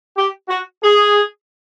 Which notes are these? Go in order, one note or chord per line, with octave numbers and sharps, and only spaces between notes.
G4
F#4
G#4